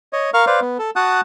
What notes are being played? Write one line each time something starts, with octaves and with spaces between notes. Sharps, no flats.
C#5 D#5
A#4 F5 C#6 F6
B4 C5 D5 F5
B3
A4
F#4 F#5 A5 D#6 F#6